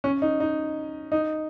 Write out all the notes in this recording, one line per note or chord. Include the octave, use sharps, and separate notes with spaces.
C#4
D#4
D#4
D#4